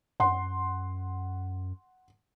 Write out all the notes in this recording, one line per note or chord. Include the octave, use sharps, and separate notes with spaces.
F#2 F#5 C6